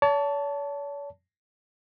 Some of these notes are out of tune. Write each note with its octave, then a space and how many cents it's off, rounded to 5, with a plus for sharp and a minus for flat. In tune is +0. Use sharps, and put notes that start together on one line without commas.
C#5 +45 A5 +0